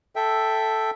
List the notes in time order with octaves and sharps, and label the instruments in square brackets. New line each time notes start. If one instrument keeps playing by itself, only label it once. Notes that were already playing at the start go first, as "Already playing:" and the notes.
[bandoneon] A4 E5 G5